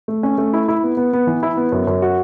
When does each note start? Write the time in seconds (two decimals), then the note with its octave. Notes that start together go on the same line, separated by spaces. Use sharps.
0.08 A3
0.23 C#4
0.38 A3
0.53 E4
0.68 E4
0.83 B3
0.97 B3
1.13 B3
1.27 E3
1.43 E4
1.57 B3
1.72 F#2
1.87 F#2
2.02 F#4